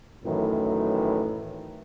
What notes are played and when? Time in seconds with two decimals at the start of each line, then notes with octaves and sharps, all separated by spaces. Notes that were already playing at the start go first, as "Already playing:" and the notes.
0.25 F#2 A2 D#3 E3